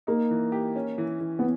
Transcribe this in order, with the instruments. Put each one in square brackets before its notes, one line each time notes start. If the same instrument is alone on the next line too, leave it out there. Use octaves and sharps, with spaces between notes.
[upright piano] A#3 [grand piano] D#4
[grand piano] E3
G4
C#4
E3
E3
[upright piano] B3